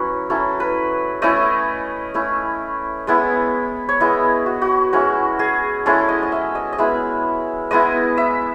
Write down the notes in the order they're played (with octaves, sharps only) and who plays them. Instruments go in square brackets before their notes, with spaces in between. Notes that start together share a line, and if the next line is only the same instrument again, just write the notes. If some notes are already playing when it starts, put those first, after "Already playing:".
Already playing: [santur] F#3 C#4 E4 B4
F#3 C#4 E4 A4
B4
A3 C#4 E4 D#5
A3 C#4 E4
G#3 B3 E4
C#5
G#3 B3 E4 D#5
F#4
F#4
G#3 C#4 E4 F#4
G#4
G#3 C#4 E4 A4
D#5
D#5
E5
D#5
D#5
G#3 B3 E4 E5
G#3 B3 E4 D#5
E5